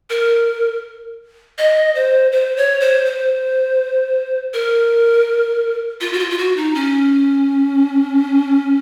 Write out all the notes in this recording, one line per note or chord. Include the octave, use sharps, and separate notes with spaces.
A#4
D#5
C5
C5
C#5
C5
C5
A#4
F4
F#4
F4
F4
F#4
D#4
C#4